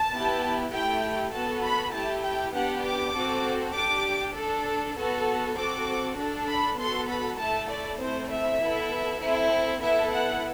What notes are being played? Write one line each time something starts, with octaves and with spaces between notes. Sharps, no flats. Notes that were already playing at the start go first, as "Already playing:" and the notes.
Already playing: A5
B3 E4 G4
A3 E4 G4 G5
B3 F#4 A4 A5
B5
A3 E4 G4 A5
G5
B3 D4 G4 F#5
D6
C4 F#4 A4
D4 G4 D6
D4 A4
B3 F#4 A4
C4 F#4 A4 D6
D4 A4
B5
B3 F#4 A4 C6
B5
A3 E4 A4 A5
D5
A3 C4 E4 C5
E5
B3 E4 A4
C4 E4 A4
B3 E4 A4 E5
F#5